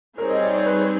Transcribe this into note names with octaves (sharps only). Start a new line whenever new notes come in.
G3 C4 D#4 G#4 A#4 C#5
D#5
D5
D5
B4